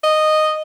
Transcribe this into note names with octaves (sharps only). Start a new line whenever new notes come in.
D#5